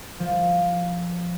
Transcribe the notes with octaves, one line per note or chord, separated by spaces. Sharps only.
F3